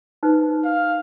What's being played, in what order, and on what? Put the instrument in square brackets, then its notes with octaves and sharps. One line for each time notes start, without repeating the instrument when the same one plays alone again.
[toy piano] D#4 B4 C5
[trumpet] F5